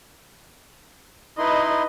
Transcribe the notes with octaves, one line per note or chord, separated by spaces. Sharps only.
D#4 E4 B4 D#5 C6